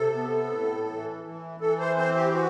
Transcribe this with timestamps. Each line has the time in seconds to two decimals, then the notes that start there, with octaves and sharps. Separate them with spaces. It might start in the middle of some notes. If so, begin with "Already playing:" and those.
Already playing: C3 A4
0.14 B3
0.51 A2
0.87 E3
1.24 E3
1.60 E3 A4
1.79 C5
1.97 C4 C5
2.16 G4
2.34 F#4